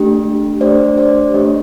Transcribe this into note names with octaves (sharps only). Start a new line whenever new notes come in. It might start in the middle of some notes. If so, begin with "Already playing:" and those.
Already playing: A3 D4 G4
A3 D4 G4 C5 D5
C5 D5
A3 D4 G4 C#5 D#5